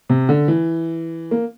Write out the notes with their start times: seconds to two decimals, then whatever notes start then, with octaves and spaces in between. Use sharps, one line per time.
0.10 C3
0.29 D3
0.48 E3
1.31 A#3